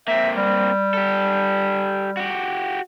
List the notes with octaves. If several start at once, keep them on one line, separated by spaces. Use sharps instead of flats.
A#3 C4 E5
G3
G4 A4
F#4 G4